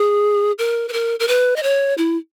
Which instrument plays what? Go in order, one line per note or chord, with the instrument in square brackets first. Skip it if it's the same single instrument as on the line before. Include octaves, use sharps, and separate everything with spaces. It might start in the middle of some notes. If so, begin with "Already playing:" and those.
Already playing: [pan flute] G#4
A#4
B4
A#4
A#4
B4
D#5
C#5
E4